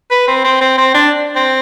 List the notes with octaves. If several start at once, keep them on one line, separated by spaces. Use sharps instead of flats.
B4
C4
C4
C4
C4
D4
C4